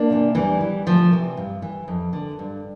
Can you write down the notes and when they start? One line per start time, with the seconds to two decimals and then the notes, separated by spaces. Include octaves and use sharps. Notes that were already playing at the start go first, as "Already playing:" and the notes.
Already playing: A#3 D4
0.10 C3 E3
0.35 E2 E3 G3
0.61 E3
0.86 D2 F3
1.11 C3 E3
1.37 G2
1.62 E3
1.88 F2
2.13 D3
2.39 G2